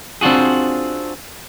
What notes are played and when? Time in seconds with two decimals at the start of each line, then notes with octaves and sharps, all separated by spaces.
0.21 C4 D4 F4 F#4 G#4